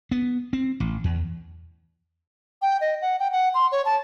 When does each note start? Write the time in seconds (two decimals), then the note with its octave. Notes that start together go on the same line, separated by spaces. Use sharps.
0.11 B3
0.53 C4
0.80 A1
1.04 E2
2.62 G5
2.81 D#5
3.02 F#5
3.19 G5
3.32 F#5
3.54 C6
3.72 C#5
3.85 A5